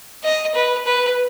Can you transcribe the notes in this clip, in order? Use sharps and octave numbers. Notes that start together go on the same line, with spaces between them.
D#5
B4
B4